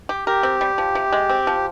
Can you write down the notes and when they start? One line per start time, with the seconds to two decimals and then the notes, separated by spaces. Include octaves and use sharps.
0.09 G4
0.27 G4 A#4
0.43 C4
0.61 G3
0.78 F3
0.95 C3
1.12 G#3
1.29 C4
1.47 F3